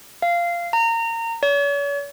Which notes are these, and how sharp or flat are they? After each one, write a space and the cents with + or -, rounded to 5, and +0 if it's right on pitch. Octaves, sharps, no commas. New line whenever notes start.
F5 -15
A#5 -25
C#5 +45